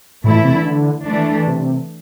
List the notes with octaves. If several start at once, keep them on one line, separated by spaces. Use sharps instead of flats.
A2 E3 A3 E4
A2
C3
D3
D3
E3 A3 D4
C3